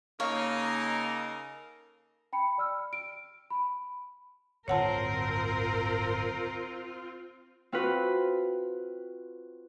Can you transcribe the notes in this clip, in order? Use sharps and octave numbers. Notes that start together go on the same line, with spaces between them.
C#3 A#3 D#4 A4 A#4 C#5 F5
G5 B5 C#7
D5 E6 F6
D7
B5
D1 G1 C4 F4 A#4 C#5 F#5 A5
C4 F4 F#4 B4